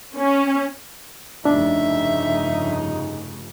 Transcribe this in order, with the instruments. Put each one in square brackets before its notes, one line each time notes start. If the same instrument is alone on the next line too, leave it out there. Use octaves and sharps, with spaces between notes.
[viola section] C#4
[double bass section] F1 G2 C#3 [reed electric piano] D4 [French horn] D#4 [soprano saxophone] E5